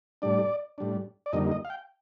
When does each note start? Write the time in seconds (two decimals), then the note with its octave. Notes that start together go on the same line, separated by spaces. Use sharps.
0.22 A2 G3 D4 D5
0.78 A2 G3 D4
1.26 D5
1.33 F2 D3 G3 A#3 D#4 D#5
1.51 D#5
1.65 F5
1.70 G5